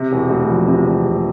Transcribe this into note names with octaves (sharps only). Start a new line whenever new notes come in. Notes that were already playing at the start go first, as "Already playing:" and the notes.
Already playing: C3
E1
D2
F3
C3
E1
D2